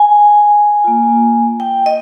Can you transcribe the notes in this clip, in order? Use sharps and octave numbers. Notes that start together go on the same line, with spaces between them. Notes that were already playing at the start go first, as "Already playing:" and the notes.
Already playing: G#5
A#3 F4
G5
D#5